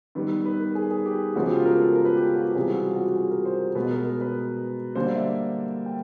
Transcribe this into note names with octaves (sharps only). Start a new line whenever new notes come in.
D#3 G3 B3 B4
B4
A#4
G#4
G#4
G4
C#3 F3 G#3 B3 F#4
G4
F4
A#4
A4
A#4
B4
G4
F4
F#4
G4
C3 E3 G3 G#4
F#4
F4
F#4
G4
G#4
A#4
C5
B2 G#3 B3 B4
A#4
A#4
B4
D3 G3 A#3 C5
D5
E5
G5